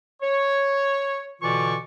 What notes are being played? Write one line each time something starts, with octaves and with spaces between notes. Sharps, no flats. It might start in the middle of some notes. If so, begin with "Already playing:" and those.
C#5
B2 D3 E3 F4 D5 C#6